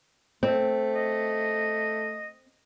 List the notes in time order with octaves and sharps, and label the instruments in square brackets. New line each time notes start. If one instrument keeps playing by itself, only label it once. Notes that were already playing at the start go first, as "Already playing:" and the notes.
[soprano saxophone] A3 [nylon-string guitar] C4
[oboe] D#5